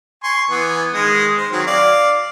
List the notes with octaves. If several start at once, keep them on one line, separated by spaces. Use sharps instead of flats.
G#5 C6 C#6
E3 B3 G#5
D#3 G#3 D#6
C5
D#3 F#3 C4
D5 F5